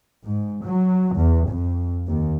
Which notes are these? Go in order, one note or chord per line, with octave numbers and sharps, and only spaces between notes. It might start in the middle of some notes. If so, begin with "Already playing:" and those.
G#2
F#3
E2
F2
D#2